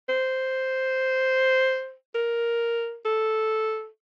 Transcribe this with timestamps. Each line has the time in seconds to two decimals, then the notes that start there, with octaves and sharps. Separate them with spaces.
0.09 C5
2.15 A#4
3.05 A4